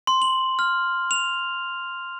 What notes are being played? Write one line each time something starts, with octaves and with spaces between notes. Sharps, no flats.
C6
F#7
F6
F7